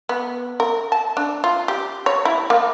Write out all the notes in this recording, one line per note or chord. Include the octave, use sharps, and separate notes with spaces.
B3
A#4
A5
D4
F4
G4
C#5
E4
A#3